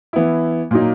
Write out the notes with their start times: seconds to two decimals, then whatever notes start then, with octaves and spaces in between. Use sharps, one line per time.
0.13 E3 B3 E4
0.71 A#2 F#3 A#3 D#4